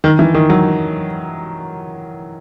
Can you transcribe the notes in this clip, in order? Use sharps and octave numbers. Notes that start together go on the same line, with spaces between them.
D#3
E3
D#3
F#3